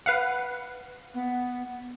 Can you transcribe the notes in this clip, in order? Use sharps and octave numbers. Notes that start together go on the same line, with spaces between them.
B4 F5 F#5
B3